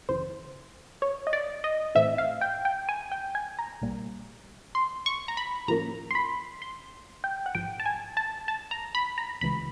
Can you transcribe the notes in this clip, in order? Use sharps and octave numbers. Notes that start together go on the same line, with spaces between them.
G#1 F#2 C#3 E3 C5
C#5
D#5
D5
D#5
A2 E3 A3 C4 E5
F5
G5
G5
G#5
G5
G#5
A#5
B1 A#2 G3 A#3
C6
C#6
A#5
B5
A2 F3 A#3 C#4 A#5
C6
B5
C6
G5
F#5
A1 G#2 F3 G5
A5
G#5
A5
A5
A#5
B5
A#5
C#2 C#3 E3 G#3 B5